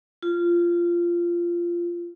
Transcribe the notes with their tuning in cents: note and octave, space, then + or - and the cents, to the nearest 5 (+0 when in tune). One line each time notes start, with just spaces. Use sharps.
F4 -15